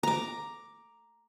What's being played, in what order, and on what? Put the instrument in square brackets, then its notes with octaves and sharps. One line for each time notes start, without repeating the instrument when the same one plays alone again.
[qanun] A#5 D6